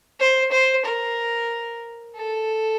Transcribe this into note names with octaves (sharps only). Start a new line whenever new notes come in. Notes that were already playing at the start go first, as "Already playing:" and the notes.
C5
C5
A#4
A4